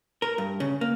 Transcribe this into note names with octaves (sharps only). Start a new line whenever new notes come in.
A#4
G2
C#3
A#3